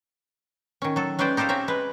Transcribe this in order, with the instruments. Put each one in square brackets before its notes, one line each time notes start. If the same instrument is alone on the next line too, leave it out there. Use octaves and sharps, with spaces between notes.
[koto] D#3 C#4
F#3 A4
G#3 C#4 B4 C5 D5 G5
D#4 G4 A4 C5 F5
C4 C#4 E5 A#5
G#3 B4